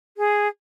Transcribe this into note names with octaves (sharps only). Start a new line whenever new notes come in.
G#4